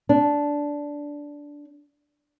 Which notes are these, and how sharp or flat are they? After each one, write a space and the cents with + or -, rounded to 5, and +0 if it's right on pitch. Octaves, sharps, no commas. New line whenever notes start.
D4 -10